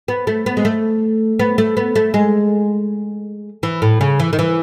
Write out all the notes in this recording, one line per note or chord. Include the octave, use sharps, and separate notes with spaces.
B3
A3
B3
G#3
A3
B3
A3
B3
A3
G#3
E3
A2
C#3
E3
D#3
E3